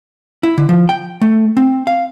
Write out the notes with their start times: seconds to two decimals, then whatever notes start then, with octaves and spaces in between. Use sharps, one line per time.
0.43 E4
0.58 D3
0.69 F3
0.89 G5
1.22 A3
1.57 C4
1.87 F5